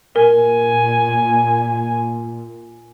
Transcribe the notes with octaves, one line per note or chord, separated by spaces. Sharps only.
A#2 A#4 G#5